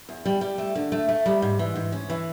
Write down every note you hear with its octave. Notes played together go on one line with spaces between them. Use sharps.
E2
G3
G3
A3
D3
A3
A3
G3
G#2
E3
G#2
C#4
E3